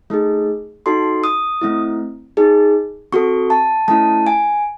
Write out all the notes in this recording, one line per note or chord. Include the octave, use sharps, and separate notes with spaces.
A3 D#4 G#4
D#4 F#4 A4 C6
D#6
A3 C4 E4
D#4 G#4
C4 F#4 A4 C#6
A5
A3 C#4 E4 A5
G#5